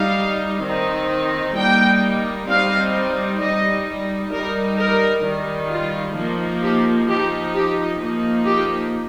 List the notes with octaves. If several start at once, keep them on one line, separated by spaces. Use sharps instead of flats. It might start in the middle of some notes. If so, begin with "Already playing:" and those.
Already playing: G3 D#4 F5
D#3 C4 D#4
G3 A#3 D#4 G5
G3 C4 D#4 F5
G3 D#4 D#5
G3 D#4 A#4
A#4
D#3 G3 D#4
F4
F3 A#3 D#4
G4
F3 D#4 G4
G4
F3 A#3 D#4
G4